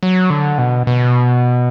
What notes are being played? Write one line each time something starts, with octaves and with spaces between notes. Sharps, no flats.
F#3
D3
B2
B2